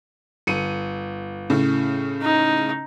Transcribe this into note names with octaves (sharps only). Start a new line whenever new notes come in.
G1 C#7 D#7
A2 C#3
D#4